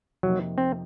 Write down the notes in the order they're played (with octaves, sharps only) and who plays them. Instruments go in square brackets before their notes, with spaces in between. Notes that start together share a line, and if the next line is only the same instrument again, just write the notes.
[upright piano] F2 C3 F3 A#3 D#4 [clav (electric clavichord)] F#3
[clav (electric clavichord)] C4